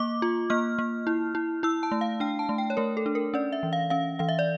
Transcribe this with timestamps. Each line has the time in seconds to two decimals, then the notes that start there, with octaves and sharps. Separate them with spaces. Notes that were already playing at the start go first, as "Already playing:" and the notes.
Already playing: A#3 D6
0.22 F4
0.50 A#3 F6
0.79 A#3
1.07 E4
1.35 E4
1.63 E4 E6
1.83 A5
1.92 A3
2.01 F5
2.20 D4 G5
2.39 A5
2.49 A3
2.58 G5
2.70 C#5
2.77 A3 A#4
2.97 A4
3.06 D4
3.15 A#4
3.34 C#4 D5
3.52 E5
3.63 E3
3.73 F5
3.90 C#4 F5
4.19 E3 F5
4.29 E5
4.39 D5